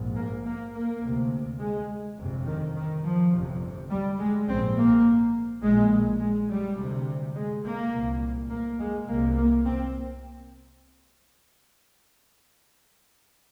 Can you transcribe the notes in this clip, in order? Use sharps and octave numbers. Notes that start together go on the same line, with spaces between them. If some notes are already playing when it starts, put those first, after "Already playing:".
Already playing: A#1 G#2
A#3
A#3
A#3
D2 C3
G#3
G1 F2 C3
D#3
D#3
F3
G1 F2 C3
G3
G#3
A#1 G#2 C4
A#3
A#1 A#2 G#3
G#3
G3
D2 C3
G#3
A#3
C2 A#2
A#3
G#3
C2 C3 A#3
A#3
C4